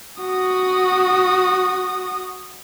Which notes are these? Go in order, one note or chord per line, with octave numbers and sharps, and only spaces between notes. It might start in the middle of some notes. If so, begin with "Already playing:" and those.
F#4 D#6